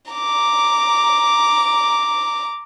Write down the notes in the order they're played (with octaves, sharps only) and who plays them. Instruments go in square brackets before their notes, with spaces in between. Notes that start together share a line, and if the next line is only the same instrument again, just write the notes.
[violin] A#5 D6